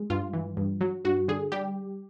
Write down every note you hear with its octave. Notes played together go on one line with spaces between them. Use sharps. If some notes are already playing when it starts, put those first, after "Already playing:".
Already playing: G#3
G2 F4
E3
G2
F#3
G2 F#4
D3 G#4
G3 G4